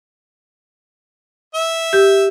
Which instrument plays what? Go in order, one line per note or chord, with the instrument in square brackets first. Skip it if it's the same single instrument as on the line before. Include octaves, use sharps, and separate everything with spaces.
[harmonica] E5
[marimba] G4